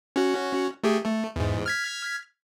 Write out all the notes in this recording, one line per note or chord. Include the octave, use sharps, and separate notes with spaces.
C#4 F#4
A3 G4 G#4
A3
E2 G#2
F6 G#6 B6